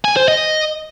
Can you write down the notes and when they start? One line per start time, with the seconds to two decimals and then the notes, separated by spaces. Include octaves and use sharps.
0.05 G#5
0.16 C5
0.28 D#5